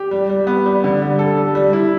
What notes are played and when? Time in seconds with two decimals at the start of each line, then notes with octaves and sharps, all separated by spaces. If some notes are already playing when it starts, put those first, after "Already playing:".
Already playing: G4
0.11 G3
0.29 G3
0.47 B3
0.66 G3
0.84 D3
1.02 G3
1.19 A4
1.37 G3
1.55 G3
1.73 E4